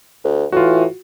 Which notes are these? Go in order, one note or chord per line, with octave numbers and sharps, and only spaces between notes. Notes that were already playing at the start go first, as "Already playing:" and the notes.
D2
A2 E3 F4 F#4